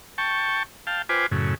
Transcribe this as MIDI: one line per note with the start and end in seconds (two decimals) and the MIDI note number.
0.18 0.63 79
0.18 0.63 81
0.18 0.63 85
0.87 1.02 77
0.87 1.02 79
0.87 1.02 81
1.09 1.26 65
1.09 1.26 71
1.09 1.26 72
1.09 1.26 79
1.09 1.26 80
1.09 1.26 86
1.32 1.55 42
1.32 1.55 45
1.32 1.55 49